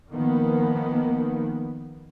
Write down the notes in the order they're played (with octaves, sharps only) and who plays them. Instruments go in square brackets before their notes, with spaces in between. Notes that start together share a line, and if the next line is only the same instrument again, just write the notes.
[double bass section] D#3 F3 A#3 B3